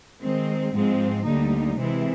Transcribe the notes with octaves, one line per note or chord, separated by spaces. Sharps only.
D#3 G#3 C4
G#2 F3 G#3 C4
D2 D3 G3 A#3 D#4
C3 E3 G#3 C4 E4